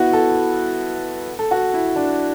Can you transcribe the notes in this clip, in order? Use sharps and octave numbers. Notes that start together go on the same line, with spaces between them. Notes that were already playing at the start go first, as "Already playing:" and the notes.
Already playing: B3 E4 F#4
A4
A4
F#4
E4
D4